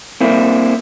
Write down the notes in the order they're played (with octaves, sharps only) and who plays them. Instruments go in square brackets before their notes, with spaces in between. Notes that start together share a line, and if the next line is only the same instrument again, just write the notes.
[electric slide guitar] A#3 C4 E4